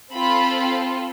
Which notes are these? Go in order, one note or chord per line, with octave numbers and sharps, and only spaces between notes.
C4 F4 A4 B5